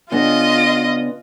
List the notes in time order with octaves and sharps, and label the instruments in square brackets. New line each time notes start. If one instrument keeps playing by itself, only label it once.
[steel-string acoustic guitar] C#3 B3 D4 [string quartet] F4 D#5 A#6